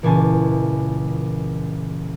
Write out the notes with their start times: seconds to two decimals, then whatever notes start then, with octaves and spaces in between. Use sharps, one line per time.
0.03 C#2 A#2 E3 C#4 G#5 A5